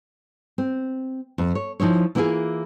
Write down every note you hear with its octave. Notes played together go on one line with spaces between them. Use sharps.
C4
F2
C#5
F3 D#4 E4 C#5
E3 A#3 B3 E4 F4 G#4